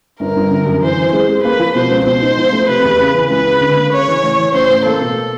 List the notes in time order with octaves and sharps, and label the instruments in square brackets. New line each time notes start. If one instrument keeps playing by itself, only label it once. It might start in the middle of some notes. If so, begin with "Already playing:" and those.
[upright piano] G1 [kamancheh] A#4
[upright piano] G1
D3
F#2
[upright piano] E3 [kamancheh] C5
[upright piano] E3
[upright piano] G#3 [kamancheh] C5
[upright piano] G#3
[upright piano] A#3 [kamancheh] B4
[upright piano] F3
[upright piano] B2 [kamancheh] C5
[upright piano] C#2
[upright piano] B2 [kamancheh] C5
[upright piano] D#4
F3
A3
[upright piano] C3 [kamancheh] B4
[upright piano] E2
C#3
E3
[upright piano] C#2 [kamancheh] B4
[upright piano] C#3
D3
A#3
[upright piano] C#3 [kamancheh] C#5
[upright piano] E3
A1
E3
[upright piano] A1 [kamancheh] C5
[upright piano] A1
[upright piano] A#3 [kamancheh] A4
[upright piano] B2